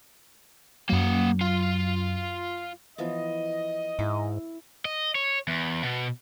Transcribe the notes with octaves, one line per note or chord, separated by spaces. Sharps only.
F#2 F#3 A#3 F#5
F4
E3 F3 B3 D#5
G#2 E4
D#5
C#5
E2
B2